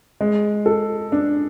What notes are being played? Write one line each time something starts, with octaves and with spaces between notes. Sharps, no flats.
G#3
A4
D4